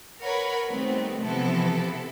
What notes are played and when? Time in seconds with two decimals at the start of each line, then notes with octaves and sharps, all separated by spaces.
0.22 A#4 B4 C#5 F#5 B5
0.70 D#3 G3 A3 B3 C4
1.23 C3 E3 F3 B3 E4 A4